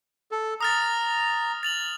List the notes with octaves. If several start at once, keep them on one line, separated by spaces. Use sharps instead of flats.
A4
A#5 D#6 F6 A6
A6 F7 F#7